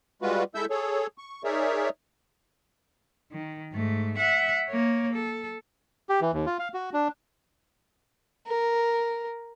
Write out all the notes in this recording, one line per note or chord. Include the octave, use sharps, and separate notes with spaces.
G3 G#3 F4 F#4 B4
G#3 E4 A4 E5 E6 G6
G#4 A4 C#5
C#6
D#4 G#4 A#4 C#5 D5 E5
D#3
G#2 A3
E5 F#5
A#3 C#5
A4
G4
E3
D#2
F4
F5
F#4
D4
A#4